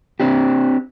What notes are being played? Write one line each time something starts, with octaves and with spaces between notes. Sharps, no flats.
C4 D4 G4